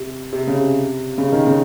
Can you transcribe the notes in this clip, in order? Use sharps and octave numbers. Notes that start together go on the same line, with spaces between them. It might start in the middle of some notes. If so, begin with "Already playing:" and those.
Already playing: C3
C3
C#3
C3
C#3
D#3
C#3